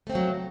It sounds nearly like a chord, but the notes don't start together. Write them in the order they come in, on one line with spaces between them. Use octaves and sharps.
A3 C4 F3 F#3